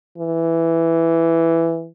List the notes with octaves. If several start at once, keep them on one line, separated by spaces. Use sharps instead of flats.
E3